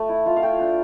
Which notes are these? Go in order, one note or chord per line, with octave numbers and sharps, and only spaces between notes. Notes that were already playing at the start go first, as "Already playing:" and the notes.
Already playing: A3
E4
F4 F5
F5
A3 G5
D4